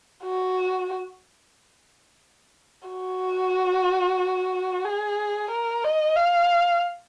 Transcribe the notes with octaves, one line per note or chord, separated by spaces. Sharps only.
F#4
F#4
G#4
A#4
D#5
F5